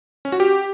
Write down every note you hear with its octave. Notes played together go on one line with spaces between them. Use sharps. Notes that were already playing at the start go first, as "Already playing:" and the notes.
C#4
F#4
G4